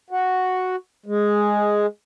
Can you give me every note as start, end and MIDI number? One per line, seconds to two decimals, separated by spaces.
0.10 0.76 66
1.06 1.86 56